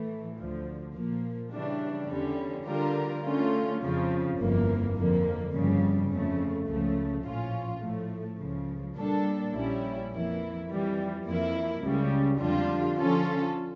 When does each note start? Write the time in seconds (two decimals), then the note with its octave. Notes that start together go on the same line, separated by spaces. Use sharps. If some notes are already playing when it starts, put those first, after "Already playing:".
Already playing: A2 E3 A3
0.38 D2 D3 F3
0.95 A#2 F3 A#3
1.52 C#3 E3 G3 D4
2.09 E2 D3 G3 C#4
2.67 D3 G3 D4 F4 A#4
3.24 D3 A3 C#4 F4
3.81 F2 C#3 F3
4.38 G1 F2 E3 A#3
4.96 F2 D3 F3 A#3
5.53 G1 F2 C#3 G3
6.10 F2 C#3 F3 A3
6.68 C#2 C#3 F3 A3
7.25 A#1 A2 F3 C#4 F4
7.82 A2 F3 A3
8.39 C#2 C#3 F3
8.96 A#2 G3 A#3 D4 A4
9.53 A#1 A#2 G3 C#4 E4
10.11 F2 E3 A#3 E4
10.68 F2 E3 G3
11.25 F2 E3 A#3 E4
11.82 C#2 C#3 G3
12.40 F2 D3 G3 D4 F4
12.98 D3 F3 C#4 F4 A4